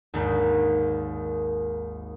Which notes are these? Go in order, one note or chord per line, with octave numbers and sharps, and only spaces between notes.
G#1 D#2